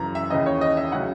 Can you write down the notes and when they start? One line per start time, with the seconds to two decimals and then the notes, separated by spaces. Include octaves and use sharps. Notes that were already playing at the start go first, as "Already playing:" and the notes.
Already playing: F#2 C#3 E3 A#5
0.15 E5
0.30 D#2 C#3 E3 D#5
0.46 C#5
0.61 D#5
0.77 E5
0.92 C#3 F#3 F#5